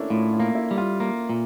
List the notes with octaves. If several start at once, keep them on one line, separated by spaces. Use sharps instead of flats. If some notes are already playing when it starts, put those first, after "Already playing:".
Already playing: A3 A#3 C#4 D4 E4
A2 F4
F4
A#3
E4
G3
F4
A#3
A#2